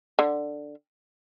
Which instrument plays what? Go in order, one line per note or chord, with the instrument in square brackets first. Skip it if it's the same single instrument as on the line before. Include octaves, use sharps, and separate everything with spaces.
[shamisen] D3